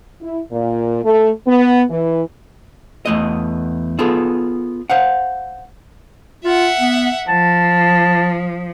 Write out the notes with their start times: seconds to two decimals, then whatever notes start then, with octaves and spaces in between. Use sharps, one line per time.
0.21 E4
0.52 A#2
1.04 A3
1.46 B3
1.90 E3
3.05 E2 A3 D#5
3.99 B3 F4 G#4 A4
4.90 C5 F5 F#5
6.44 F4 E5 F#5
6.80 B3
7.28 F3 A5